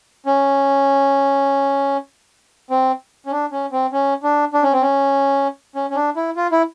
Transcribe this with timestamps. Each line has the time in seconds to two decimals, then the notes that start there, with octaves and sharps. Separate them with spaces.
0.26 C#4
2.70 C4
3.26 C#4
3.32 D4
3.52 C#4
3.72 C4
3.92 C#4
4.23 D4
4.54 D4
4.63 C#4
4.73 C4
4.82 C#4
5.75 C#4
5.90 C#4
5.96 D4
6.16 E4
6.36 F4
6.52 E4